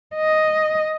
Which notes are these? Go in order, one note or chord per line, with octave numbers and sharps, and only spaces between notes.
D#5